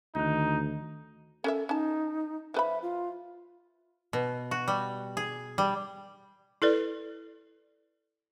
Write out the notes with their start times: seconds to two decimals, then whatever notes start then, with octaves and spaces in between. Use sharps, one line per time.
0.15 D2 D#3 D#4 G6
1.44 C#4 A4 A#4 E5
1.69 C#4 D#4 A5
2.54 F3 B4 E5 B5
2.82 F4
4.13 B2
4.51 F#4
4.68 G3
5.17 G#4
5.58 G3
6.62 E4 A4 B4 D5